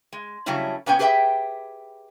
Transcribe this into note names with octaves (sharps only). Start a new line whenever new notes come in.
G#3
C#3 F#3 G3 A3 C#4 E4
A#2 B3 C#4 G5 G#5
G4 G#4 B4 D5 E5 G5